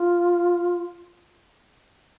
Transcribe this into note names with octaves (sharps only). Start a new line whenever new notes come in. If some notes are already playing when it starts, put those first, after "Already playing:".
Already playing: F4